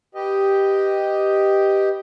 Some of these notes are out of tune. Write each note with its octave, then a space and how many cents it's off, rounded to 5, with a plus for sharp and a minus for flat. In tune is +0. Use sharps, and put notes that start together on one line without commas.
G4 +0 B4 +0 D#5 +0